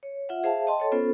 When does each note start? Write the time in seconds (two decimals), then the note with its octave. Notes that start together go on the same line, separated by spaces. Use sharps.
0.03 C#5
0.29 F4 E5 F#5
0.43 G#4 C5 E5 F5 A5
0.67 D#5 G5 A5 C6
0.80 A4 C#5
0.92 B3 C#4 F4 A4 C5